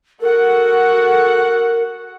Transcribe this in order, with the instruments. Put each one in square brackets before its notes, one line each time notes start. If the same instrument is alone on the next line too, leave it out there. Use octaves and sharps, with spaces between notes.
[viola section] F#4 A4 F#5 [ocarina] A#4